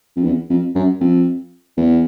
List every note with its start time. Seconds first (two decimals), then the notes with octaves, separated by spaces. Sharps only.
0.16 F2
0.24 E2
0.50 F2
0.75 F#2
1.01 F2
1.77 E2